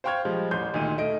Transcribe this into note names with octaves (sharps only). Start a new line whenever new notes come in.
C5 F5 G5 C#6 F6 G#6
F3 G3 G#3
A1 C6 G6
D2 A#2 D#3 D#7
A3 D#5 D7